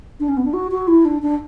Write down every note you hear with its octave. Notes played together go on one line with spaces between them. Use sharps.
D4
C#4
B3
D4
F#4
F#4
E4
D4
D4